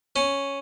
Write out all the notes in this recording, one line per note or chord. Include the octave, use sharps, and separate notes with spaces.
C#4